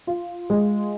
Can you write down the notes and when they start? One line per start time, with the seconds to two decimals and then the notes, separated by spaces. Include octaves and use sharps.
0.07 F4
0.50 G#3